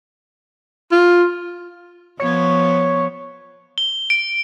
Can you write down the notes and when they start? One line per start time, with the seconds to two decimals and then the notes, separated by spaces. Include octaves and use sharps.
0.92 F4
2.19 F3 B3 C#5
3.78 G7
4.10 D7